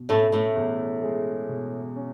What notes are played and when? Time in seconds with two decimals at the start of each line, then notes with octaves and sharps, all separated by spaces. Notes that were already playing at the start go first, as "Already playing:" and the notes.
Already playing: B2
0.09 A2 A3 C#4
0.32 A2 A3
0.56 E2
1.02 G#3
1.49 B2
1.96 C#4